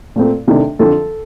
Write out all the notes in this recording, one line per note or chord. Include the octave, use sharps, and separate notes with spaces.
A#2 A3 C4
C3 D#3 A3 D4
F2 D3 F3 A4